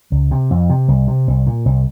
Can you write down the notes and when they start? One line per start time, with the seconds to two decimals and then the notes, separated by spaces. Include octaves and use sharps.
0.12 C#2
0.31 C3
0.51 F2
0.70 C3
0.88 C2
1.08 C3
1.28 C2
1.47 A#2
1.65 C2